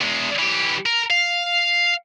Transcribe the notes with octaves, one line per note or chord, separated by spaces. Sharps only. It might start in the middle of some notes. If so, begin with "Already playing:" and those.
E2 G#3
E3 G4
A#4
F5